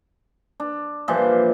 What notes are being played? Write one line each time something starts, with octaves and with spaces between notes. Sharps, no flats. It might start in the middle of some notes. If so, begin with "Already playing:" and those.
D4
A#2 E3 F3 G3